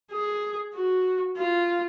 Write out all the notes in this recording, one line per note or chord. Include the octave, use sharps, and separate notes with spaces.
G#4
F#4
F4